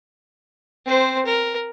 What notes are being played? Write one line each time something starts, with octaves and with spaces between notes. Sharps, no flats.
C4 C5
A#4